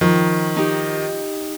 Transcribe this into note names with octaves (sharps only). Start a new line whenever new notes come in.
D#3 F3
D#4 G4